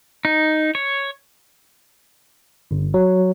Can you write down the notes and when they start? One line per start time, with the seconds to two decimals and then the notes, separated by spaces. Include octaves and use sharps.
0.25 D#4
0.75 C#5
2.71 G1
2.94 F#3